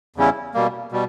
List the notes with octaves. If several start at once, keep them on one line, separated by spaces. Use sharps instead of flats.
E2 C#3 G3 C#4 E4
B2 G3 A#3
B2 G3